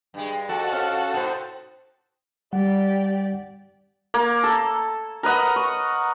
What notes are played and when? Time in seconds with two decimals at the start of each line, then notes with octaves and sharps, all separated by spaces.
0.14 G2 G#3
0.49 F2 F#4 A4
0.72 C#4 F5
1.14 A2 D#4 C5
2.53 G3 G4 D5 F#5
4.14 A#3
4.43 A4
5.23 A#4 B4 D#5 F#5
5.56 C#6